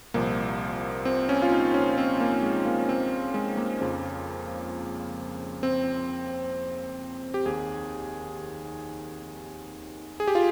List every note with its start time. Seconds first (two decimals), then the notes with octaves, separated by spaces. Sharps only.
0.14 C2 A#2 F3 A#3
1.05 C4
1.29 C#4
1.42 F4
1.52 D#4
1.74 C#4
1.98 C4
2.20 A#3
2.43 G#3
2.65 A#3
2.80 C#4
2.89 C4
3.34 G#3
3.57 A#3
3.81 F2 C#3 F3
5.63 C4
7.34 G4
7.46 D#2 D#3 G#4
10.20 G#4
10.27 G4
10.35 F4